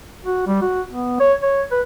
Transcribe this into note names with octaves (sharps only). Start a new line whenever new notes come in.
F#4
G3
F#4
B3
C#5
C#5
B4